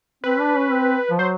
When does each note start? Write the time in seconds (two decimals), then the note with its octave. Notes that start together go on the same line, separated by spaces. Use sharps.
0.24 C4 B4
0.40 D4
0.56 C#4
0.71 C4
1.10 F3
1.19 F#3 C5